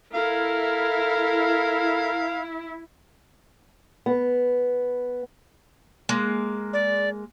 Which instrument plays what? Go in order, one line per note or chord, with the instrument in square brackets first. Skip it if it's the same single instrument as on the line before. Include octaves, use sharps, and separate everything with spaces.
[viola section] E4 [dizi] A4 [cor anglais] A#4 [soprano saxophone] F5
[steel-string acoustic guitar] B3
[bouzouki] G#3 A#3
[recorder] D5